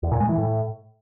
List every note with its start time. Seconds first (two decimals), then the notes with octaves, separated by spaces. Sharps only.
0.03 E2
0.11 A#2
0.20 G#3
0.29 E3
0.38 A2